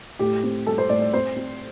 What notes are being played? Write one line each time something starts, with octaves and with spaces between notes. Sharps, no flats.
A2 G4
C4
G3 A4
C5
A2 D5
D5
C4 C5
C4